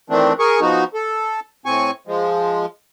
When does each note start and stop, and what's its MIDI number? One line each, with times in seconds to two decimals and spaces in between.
0.10 0.33 51
0.10 0.33 52
0.10 0.33 57
0.10 0.33 60
0.10 0.33 62
0.39 0.60 68
0.39 0.60 70
0.39 0.60 80
0.39 0.60 85
0.61 0.84 53
0.61 0.84 59
0.61 0.84 63
0.61 0.84 66
0.94 1.40 69
1.66 1.91 45
1.66 1.91 60
1.66 1.91 80
1.66 1.91 85
2.07 2.66 53
2.07 2.66 56